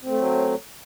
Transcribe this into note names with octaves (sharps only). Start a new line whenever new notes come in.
A2 F#3 A3 C4